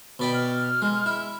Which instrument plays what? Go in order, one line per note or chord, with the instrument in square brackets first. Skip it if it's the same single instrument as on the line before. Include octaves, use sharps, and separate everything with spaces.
[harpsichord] B2 D5 G5 [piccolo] B5
[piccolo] F6
[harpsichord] G#3
E4